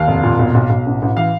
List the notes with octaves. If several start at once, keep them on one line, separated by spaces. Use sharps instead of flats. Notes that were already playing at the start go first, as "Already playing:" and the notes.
Already playing: D#2 F5
F1
A#2
B1
B1
B1
A1
A1
E3 F5